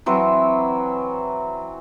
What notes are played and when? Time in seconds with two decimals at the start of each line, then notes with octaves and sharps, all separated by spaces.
0.06 E3 F#3 C4